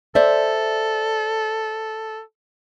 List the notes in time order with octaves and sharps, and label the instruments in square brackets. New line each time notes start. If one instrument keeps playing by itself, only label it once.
[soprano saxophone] A4 [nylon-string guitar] C5 D5 E5